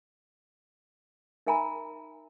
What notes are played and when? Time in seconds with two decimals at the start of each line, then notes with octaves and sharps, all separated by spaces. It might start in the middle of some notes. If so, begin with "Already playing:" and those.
1.47 D#4 A#4 E5 G#5 A#5 B5